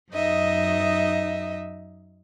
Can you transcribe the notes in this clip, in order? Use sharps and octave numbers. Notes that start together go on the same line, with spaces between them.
F#2 D#4 D#5 E5